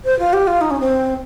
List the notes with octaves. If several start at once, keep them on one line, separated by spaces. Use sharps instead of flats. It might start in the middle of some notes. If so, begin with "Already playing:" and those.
C5
F4
G4
F4
D#4
C#4
C4